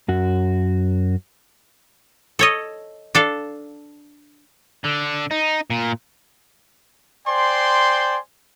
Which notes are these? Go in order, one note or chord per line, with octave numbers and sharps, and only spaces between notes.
F#2 F#4
A4 C#5 D#5
D4 A4 F5
D3
D#4
A#2
C5 D5 G5 G#5 C6